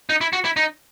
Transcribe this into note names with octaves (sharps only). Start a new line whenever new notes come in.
D#4
E4
F#4
E4
D#4